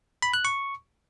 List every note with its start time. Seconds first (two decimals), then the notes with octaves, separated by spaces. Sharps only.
0.22 B5
0.34 F#6
0.45 C#6